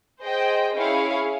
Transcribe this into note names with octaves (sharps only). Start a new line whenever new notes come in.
G#4 C5 D#5 G5
C#4 E4 G#4 C#5 F5